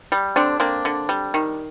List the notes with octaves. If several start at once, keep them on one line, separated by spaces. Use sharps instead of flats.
G3
D3 C4 D4
A#3 C4 D4
D3
G3
D#3